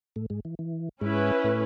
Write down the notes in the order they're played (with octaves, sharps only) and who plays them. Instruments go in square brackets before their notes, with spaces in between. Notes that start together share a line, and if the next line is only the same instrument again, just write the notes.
[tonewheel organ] A2 A3
G#2 G#3
E3
E3
[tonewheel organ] G#2 G#3 [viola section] C#4 E4 B4
[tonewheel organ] A2 A3